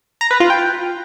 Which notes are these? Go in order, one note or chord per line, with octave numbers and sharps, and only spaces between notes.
A#5
B4
F4
G5